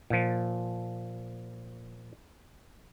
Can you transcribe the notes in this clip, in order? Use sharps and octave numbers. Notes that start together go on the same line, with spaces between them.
A#2 F3